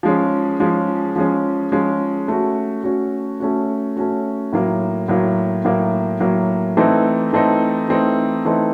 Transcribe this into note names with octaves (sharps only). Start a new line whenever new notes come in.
F3 G#3 C#4
F3 G#3 C#4
F3 G#3 C#4
F3 G#3 C#4
A3 C#4 F#4
A3 C#4 F#4
A3 C#4 F#4
A3 C#4 F#4
A2 F#3 A#3
A2 F#3 A#3
A2 F#3 A#3
A2 F#3 A#3
E3 A3 C4 D#4
E3 A3 C4 D#4
E3 A3 C4 D#4
E3 A3 C4 D#4